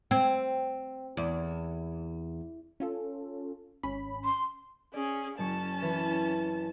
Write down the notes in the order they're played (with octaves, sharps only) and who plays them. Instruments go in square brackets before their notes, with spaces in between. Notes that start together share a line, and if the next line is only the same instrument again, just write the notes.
[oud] C4
E2
[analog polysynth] C#4 F4 A4
G#1 C#4 B5
[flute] C6
[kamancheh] C#4 G#4 [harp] D5
[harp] F#1 F#3 C#6 [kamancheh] C#4 A5
[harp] E3 B4 C#5